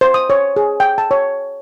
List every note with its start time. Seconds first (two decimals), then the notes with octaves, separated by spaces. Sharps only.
0.01 C5
0.14 D#6
0.30 C#5
0.56 G#4
0.80 G5
0.98 A5
1.11 C#5